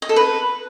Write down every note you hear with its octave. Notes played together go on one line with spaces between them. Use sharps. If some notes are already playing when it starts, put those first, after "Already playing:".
D#5
A4
B4